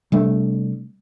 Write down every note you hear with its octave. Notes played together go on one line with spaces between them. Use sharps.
C3 G3 A3 D4